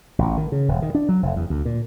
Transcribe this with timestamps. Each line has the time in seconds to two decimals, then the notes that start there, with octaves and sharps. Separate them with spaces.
0.19 A1
0.38 D#3
0.52 C#3
0.68 D#1
0.82 D#3
0.95 D4
1.09 F#3
1.23 F1
1.36 E2
1.50 D2
1.65 A#2